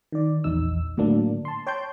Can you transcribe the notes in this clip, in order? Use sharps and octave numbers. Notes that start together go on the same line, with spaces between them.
D#3 D5
A#1 E2 D#4 E6
A2 D3 F#3 A#3 D4
A5 C6
C#5 G5 A5 C6 G6